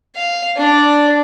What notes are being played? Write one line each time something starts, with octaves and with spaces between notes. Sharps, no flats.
F5
D4 D5